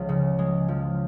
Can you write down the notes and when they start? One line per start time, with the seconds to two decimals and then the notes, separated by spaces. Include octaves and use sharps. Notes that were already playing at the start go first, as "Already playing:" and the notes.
Already playing: C#2 F3
0.09 C#3
0.39 G#3
0.68 F3